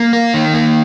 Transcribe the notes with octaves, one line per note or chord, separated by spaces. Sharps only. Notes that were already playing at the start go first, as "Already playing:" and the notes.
Already playing: A#3
A#4
D#3
A#3